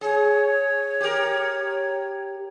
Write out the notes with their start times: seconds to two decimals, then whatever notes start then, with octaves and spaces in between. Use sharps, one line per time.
0.01 G#4 C#5
1.01 G4 A#4